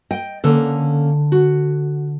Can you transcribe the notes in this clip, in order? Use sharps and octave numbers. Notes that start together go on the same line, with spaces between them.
D#5 G5
D3 A#3 C#4 A4
F#4